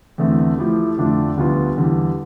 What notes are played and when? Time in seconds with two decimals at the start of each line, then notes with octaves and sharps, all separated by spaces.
0.18 E2 D3 A3 C4
0.58 F3 A3 E4 G4
0.98 F2 D3 A3 D4 F4
1.37 D2 D3 G3 B3 F4
1.76 E2 D3 G3